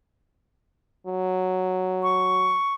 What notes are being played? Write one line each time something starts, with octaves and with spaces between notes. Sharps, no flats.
F#3
C#6